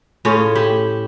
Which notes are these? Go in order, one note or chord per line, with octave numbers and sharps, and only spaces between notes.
A2 C#4 F4 G#4
E4 G4